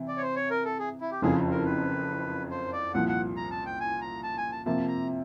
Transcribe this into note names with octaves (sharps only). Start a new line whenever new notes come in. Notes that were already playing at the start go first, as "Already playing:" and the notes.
Already playing: C3 E3
D5
C#5
C5
C#5
A#4
A4
G#4
E4
G4
F#1 F2 C#3 F3 G#4
A#4
B4
C5
D5
C2 A#2 F3 F#5
F#5
A#5
A5
G5
G#5
A#5
A5
G#5
A5
C3 F3 A#3 A5
A#5